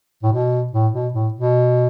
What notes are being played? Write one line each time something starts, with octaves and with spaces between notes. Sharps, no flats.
A2
B2
A2
B2
A2
B2